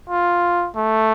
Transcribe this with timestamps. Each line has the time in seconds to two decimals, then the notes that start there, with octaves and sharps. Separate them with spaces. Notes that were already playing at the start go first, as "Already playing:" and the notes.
0.10 F4
0.75 A3